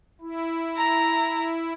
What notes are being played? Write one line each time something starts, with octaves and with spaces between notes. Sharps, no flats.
E4
A#5